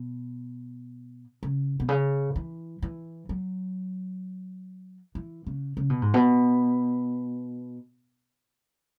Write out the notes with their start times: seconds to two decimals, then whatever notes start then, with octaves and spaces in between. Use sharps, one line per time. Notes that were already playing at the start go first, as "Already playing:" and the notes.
Already playing: B2
1.43 C#3
1.80 B2
1.89 C#3
2.36 E3
2.82 E3
3.29 F#3
5.15 E3
5.47 C#3
5.77 C#3
5.90 B2
6.02 G#2
6.14 B2